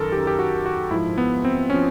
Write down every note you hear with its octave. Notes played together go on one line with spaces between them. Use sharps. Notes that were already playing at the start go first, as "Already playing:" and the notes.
Already playing: F#2 D#3 A4 A#4
F#2 D#3 G4
G4
F#4
F#4
G#2 F3 E4
B3
C4
F3 C#4